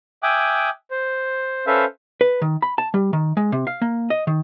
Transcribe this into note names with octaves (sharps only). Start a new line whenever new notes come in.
E5 G5 G#5 D6 D#6 F#6
C5
C#4 A4 B4 C5 E5 F5
B4
D#3
B5
A5
G3
D#3
G#3
C3
F5
A#3
D#5
D#3